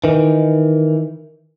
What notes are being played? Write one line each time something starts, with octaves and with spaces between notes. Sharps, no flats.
D#3 E3